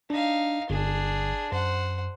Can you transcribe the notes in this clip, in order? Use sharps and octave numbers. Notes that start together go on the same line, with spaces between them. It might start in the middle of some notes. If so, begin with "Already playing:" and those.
D4 D#4 F5
G1 D4 G#4
F#2 C5 F#5